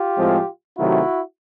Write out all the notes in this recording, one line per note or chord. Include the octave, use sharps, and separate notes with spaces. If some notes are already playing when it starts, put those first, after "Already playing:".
Already playing: F4 G4
A2 F3 G#3 C4
C3 D#3 F#3 A3 E4 F#4